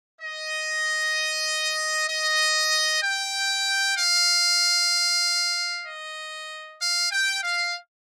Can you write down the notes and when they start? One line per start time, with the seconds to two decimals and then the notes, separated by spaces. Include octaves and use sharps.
0.20 D#5
2.08 D#5
3.03 G5
3.97 F5
5.87 D#5
6.80 F5
7.11 G5
7.44 F5